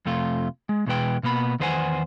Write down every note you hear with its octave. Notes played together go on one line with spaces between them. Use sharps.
F2 C3 A3 F4
G#3
E2 B2 E3 G#3 B4 G5
B2 A#3 B3 B5
E2 D#3 B4 C5 F#5 G#5